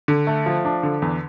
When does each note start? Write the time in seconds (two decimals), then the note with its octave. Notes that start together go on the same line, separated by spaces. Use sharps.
0.08 D3
0.27 A3
0.46 F3
0.65 D4
0.83 D3
1.02 E2